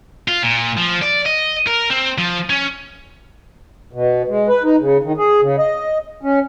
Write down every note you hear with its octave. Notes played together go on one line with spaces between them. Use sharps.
F4
A#2
F3
D5
D#5
A#4
C4
F3
C#4
B2
G#3
B4
D#4
C#3
D#3
G#4
C#3
D#5
C#4